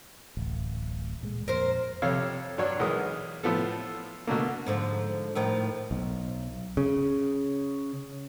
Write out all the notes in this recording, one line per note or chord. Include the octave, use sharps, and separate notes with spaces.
D1 A1
A#2 G#3
F2 A#2 A#4 C5
F2 C3 A4 C#5 F5
G2 F#3 D4 C#5
B1 E3 G#3 A#4 D#6
A2 F3 B3 A4
B2 D3 A3 A#3
G#2 D3 F3
A2 D#3 F3
B1
C#3